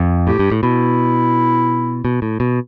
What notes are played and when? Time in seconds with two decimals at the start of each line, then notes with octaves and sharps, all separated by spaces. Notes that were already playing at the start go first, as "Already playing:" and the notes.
Already playing: F2
0.27 A2 G4
0.39 G2
0.52 A2
0.63 B2 E4
2.05 B2
2.22 A2
2.40 B2